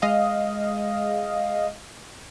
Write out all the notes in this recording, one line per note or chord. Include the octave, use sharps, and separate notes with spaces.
G#3 D#5 F5